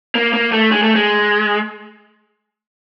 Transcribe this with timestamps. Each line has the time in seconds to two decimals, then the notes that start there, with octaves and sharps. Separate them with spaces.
0.15 A#3
0.33 A#3
0.52 A3
0.72 G#3
0.83 A3
0.95 G#3